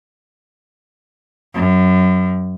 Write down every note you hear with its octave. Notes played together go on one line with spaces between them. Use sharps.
F#2